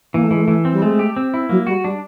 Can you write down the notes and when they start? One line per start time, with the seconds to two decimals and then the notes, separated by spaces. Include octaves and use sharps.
0.14 E3 A#3
0.24 A3
0.31 E3 G#3
0.41 A3
0.48 E3
0.65 C4
0.73 G3
0.82 G#3 A3
0.99 G4
1.16 C4
1.34 E4
1.49 F#3 A#3
1.67 G3 F#4
1.84 G3 D4